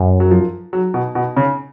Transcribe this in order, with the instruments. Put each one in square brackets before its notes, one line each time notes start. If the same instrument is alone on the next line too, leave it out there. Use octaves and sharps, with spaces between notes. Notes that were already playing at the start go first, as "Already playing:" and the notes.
Already playing: [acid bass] F#2
[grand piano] F#3
F3
F#3
B2
B2
C#3